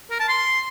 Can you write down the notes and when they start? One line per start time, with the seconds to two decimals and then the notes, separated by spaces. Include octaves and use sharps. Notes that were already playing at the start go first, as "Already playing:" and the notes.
0.11 A#4
0.19 A5
0.28 C6